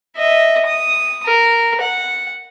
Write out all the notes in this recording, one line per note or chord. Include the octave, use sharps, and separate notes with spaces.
D#5 E5
D#6
A#4
F#5